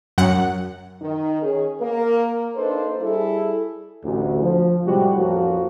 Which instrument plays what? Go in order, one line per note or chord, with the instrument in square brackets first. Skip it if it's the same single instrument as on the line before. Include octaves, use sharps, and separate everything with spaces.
[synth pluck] F#2 F#5
[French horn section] D#3
C#4 G#4
A#3 A#4
A#3 D4 D#4 A4 B4 C5
G3 E4 G#4 A4
[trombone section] A1 D2 D3
F3
A2 C3 G3 G#3 F#4 G4
A1 F2 F3 A#3 C#4 F#4